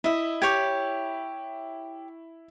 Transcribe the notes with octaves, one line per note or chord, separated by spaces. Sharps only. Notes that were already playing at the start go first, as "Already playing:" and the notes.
E4 D#5 E5
G4 C#5 C#6 D6 G6 G#6